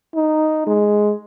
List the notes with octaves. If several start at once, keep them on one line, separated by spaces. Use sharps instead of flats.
D#4
G#3